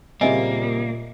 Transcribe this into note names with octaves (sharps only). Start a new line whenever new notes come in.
A#2 C#3 G3 A#3 C4 D#5 E5 G#5